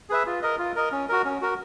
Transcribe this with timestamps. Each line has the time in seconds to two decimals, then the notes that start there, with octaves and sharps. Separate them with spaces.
0.10 G#4 B4 E5
0.26 F4
0.42 A#4 D#5
0.59 F4
0.76 A#4 D#5
0.92 C#4
1.09 F#4 A#4
1.25 C#4
1.41 F#4 A#4